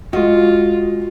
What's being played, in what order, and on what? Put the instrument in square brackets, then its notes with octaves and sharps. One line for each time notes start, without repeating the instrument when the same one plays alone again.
[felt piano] G#3 D#5 [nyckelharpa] F4 [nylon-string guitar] F#4